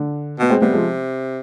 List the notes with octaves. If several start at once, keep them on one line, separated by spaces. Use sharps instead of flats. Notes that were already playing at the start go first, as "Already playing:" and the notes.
Already playing: D3
B2 B3
G#3 C4
C3 G3 B3
F3 G#3